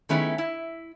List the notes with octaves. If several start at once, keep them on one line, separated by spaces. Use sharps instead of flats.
D#3 A3 B3 C#4 E4 G#4
E4